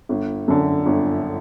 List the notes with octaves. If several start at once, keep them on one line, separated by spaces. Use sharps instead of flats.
G1
F#2 D3
G1